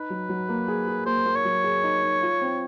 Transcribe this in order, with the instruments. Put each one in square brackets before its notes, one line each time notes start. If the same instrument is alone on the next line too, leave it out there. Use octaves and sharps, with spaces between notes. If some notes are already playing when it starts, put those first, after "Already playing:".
Already playing: [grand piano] D#4 [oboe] B4
[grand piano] F#3
F#3
A#3
G#4
G#4
[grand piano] A#3 [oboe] C5
[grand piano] A#3
[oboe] C#5
[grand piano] F#3
G#4
D#4
D#4
F4
C4